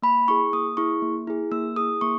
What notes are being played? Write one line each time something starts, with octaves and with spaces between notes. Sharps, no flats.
A#3 B5
E4 G#4 C#6
A#3 D#6
E4 G#4 C#6
A#3
E4 G#4
A#3 E6
E4 G#4 D#6
A#3 C#6